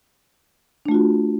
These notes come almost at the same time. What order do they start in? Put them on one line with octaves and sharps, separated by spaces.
D4 A3 F4 F#4